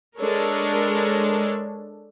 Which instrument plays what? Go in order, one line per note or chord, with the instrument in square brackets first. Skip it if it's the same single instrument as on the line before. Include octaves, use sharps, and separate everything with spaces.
[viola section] G#3 D4 A4 A#4 C#5